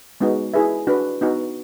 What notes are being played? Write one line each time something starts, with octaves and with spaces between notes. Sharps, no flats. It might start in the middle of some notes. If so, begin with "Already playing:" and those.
G#3 B3 D#4 F#4
E4 G#4 B4 E5
D4 F#4 B4
B3 D#4 F#4